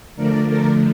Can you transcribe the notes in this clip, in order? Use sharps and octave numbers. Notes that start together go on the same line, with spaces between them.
D3 F3 A3 A#4 D5
A#4 D5